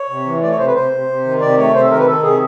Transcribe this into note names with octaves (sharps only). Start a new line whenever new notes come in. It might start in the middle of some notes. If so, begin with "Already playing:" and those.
Already playing: C#5
C3
E3
A3 D5
C#5
C3 C5
B4
C3 C5
C3
C3
D#3
C3 D5
A3 C#5
C3 C5
A4
D#3 A#4
B4
D#3 A4
C3 G#4